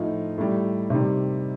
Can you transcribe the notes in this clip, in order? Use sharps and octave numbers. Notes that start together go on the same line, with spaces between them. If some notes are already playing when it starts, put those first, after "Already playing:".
Already playing: A2 F3 D#4
A2 G3
C3 D#3 G3